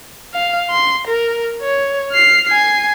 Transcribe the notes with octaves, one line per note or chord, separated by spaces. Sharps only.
F5
C6
A#4
C#5
F6 C7
G#5 C7